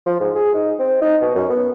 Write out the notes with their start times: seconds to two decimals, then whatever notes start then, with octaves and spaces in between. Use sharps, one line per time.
0.06 F3
0.20 G#2
0.35 G#4
0.55 D#4
0.79 C4
1.02 D#4
1.21 B2
1.36 F#2
1.50 B3